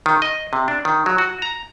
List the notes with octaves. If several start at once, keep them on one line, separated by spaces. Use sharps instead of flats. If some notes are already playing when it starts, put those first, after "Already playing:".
D#3
D#5
C3
D4
D#3
F#3
F#4
A#5